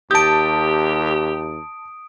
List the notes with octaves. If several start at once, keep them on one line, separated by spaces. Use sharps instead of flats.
D#2 G4 A5 D#6 G6 D7